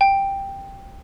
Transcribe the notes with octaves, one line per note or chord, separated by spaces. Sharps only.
G5